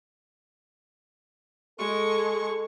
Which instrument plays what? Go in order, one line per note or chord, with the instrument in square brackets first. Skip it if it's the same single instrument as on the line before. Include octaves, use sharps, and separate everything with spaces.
[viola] G#3 C#6 [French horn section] A4